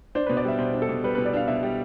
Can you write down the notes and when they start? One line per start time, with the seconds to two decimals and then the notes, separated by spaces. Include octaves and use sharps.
0.15 D4 C5
0.26 B2 B4
0.37 D5
0.45 G3 E5
0.59 B2 C5
0.74 D4
0.82 A4
0.89 B2
1.04 G3 B4
1.15 B2 B4
1.25 D5
1.33 D4 F5
1.48 B2 E5
1.63 G3